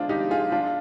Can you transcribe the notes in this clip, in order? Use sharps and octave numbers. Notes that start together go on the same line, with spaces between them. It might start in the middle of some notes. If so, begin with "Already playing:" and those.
Already playing: G#3 C4 D4 F4
D#4 G4
F4 G#4
D4 F4